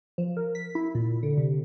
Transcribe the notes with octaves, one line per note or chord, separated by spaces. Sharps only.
F3
A#4
B6
E4
A#2
D3
C3